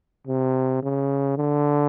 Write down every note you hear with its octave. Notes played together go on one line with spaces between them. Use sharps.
C3
C#3
D3